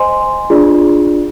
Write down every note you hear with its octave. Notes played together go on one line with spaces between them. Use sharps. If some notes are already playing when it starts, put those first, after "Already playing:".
Already playing: C5 D#5 G#5 C6
D4 F4 G#4 D5